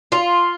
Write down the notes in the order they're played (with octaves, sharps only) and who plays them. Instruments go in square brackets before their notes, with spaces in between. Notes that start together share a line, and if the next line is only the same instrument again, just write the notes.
[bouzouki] F4